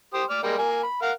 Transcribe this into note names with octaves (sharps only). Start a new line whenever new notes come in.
G4 C5 D#6
D5 F6
G3 G#3 A#3
A#3 G#5
B5
A#4 F5 F#5